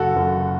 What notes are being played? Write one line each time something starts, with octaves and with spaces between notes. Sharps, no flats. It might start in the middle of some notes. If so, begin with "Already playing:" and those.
Already playing: F#1 F#4 A4
F#1